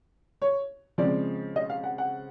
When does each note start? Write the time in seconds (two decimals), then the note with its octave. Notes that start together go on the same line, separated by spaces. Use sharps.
0.42 C#5
0.98 C#3 F3 G#3 C4 D5
1.56 D#5
1.70 F5
1.84 F#5
1.98 F#5